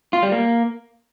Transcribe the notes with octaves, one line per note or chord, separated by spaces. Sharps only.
F4
G3
A#3